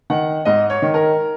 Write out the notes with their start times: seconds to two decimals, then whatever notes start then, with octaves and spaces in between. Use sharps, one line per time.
0.10 D#3 F#5
0.45 G#2 D#5
0.70 C#5
0.82 D#3
0.94 A#4